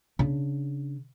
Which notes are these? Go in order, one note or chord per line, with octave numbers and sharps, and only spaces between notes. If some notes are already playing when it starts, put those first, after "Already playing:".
C#3 D4